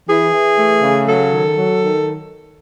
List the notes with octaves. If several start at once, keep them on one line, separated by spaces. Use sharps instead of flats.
E3 G#4
E3
A3
C#3
F#3 A4
D#3
F#3
D#3